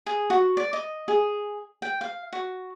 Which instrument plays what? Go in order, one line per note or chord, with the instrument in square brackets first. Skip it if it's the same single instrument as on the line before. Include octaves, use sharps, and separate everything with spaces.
[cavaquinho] G#4
F#4
D5
D#5
G#4
G5
F5
F#4